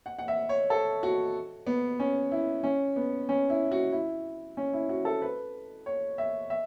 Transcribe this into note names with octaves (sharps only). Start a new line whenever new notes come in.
F#5
F#5
E5
C#5
A4
F#4
B3
C#4
E4
C#4
B3
C#4
E4
F#4
E4
C#4
E4
F#4
A4
B4
C#5
E5
E5